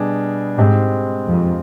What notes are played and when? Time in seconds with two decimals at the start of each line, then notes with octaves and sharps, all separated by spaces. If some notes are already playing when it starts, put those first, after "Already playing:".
Already playing: B2 G3 D4 G#4
0.58 G#2 G#3 C4 G4 C5
1.27 F2